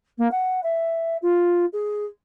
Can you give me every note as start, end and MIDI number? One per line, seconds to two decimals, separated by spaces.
0.18 0.30 58
0.32 0.60 78
0.63 1.17 76
1.22 1.66 65
1.73 2.05 68